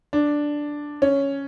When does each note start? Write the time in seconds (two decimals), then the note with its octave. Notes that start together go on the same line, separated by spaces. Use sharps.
0.13 D4
1.02 C#4